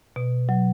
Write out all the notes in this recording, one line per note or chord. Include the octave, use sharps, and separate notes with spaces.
B2
F#3